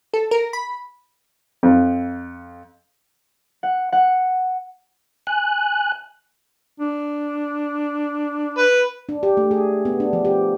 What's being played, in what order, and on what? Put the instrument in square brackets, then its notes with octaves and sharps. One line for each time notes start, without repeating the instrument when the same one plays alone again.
[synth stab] A4
A#4
B5
[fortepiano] F2
[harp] F#5
F#5
[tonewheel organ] G#5 F#6
[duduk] D4
[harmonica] B4
[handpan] D4
G4
A3
G#4
B3
D4
F3
G4